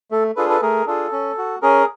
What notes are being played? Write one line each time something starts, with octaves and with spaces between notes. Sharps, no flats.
A3 A4
D4 F4 G#4 A4 B4
A4 B4
A3 G#4 A#4
D4 F4 G#4 A4
C#4
F#4
C#4 G#4 A#4